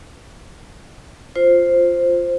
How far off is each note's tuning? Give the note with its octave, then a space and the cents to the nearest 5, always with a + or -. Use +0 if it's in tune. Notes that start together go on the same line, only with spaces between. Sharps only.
F4 +0 C5 +0